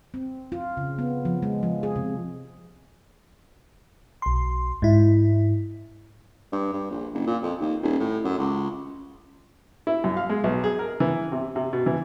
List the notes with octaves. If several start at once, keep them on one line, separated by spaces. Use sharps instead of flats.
C4
F4
C#3
B3
F3
G#3
F3
G#4
C3
B1 C6
G#2 E4
G2
G2
A#1
F#1
A#2
F2
D#2
D#1
A2
F#2
C#2
E4
F#2
F5
G#3
B1
G#4
A#4
E3
C3
C3
B2
E3